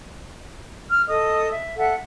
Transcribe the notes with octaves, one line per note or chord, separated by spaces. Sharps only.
F6
A4 D#5 D#6
E5
A4 E5 F#5